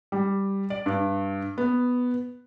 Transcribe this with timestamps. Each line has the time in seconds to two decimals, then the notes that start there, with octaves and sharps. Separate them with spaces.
0.12 G3
0.70 D5
0.86 G2
1.58 B3